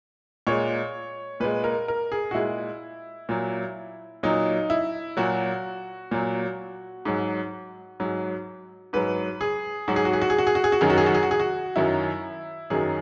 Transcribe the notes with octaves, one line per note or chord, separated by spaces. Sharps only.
A#2 G#3 C#5
A#2 G#3 B4
A#4
A#4
G#4
F#4
A#2 G#3 E4
A#2 F#3
A#2 F#3 D#4
E4
A#2 F#3 F#4
A#2 F#3
G#2 F#3
G#2 F#3
G#2 F#3 B4
G#4
G#2 F#3 F#4
G#4
F#4
G#4
F#4
G#4
F#4
G#4
F#4
G#4
F#4
F#2 D#3 F#3 G#4
F#4
G#4
F#4
G#4
F#4
G#4
F#4
F#2 D#3 F#3 E4
F#2 D#3 F#3 G#4